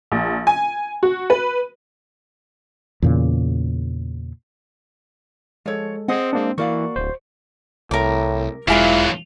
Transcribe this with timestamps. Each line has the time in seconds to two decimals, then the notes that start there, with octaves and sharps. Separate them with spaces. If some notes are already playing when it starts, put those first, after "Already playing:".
0.12 A#1
0.47 G#5
1.03 F#4
1.30 B4
3.02 E2 A#2 C#3
5.66 F3 G#3 A4 C#5
6.08 C4 G#4 D#5 F#5
6.33 G#3 A#3 C4 D4
6.58 E3 A#3 F#4 A#4 D5 F5 C#6
6.96 D1 C5
7.91 C2 A2 A#4 D6
8.68 E1 E3 F#3 G#3 E4 F4 G#4 F5